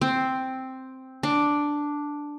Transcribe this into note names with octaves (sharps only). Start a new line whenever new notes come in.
C4
D4